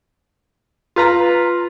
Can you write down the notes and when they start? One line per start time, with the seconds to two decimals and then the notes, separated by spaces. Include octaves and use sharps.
0.96 F4 B4 A#5